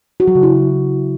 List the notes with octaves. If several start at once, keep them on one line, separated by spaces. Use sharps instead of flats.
F#4
F#3
C#3
E4